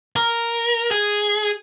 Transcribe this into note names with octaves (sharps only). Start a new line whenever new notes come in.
A#4
G#4